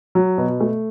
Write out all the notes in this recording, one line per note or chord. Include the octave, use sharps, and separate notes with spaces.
F#3
B2
A3